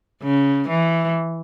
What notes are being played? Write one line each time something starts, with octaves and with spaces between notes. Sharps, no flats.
C#3
E3